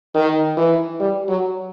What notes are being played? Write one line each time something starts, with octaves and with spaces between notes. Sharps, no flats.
D#3
E3
G3
F#3